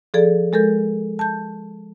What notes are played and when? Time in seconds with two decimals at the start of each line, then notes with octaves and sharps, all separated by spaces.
0.14 F3 G#4 A4 D5
0.53 G#3 A4 A#4 G6
1.19 A5 G6